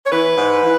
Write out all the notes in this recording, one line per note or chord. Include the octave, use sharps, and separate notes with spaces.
C#5
E3 B4
G#2
E3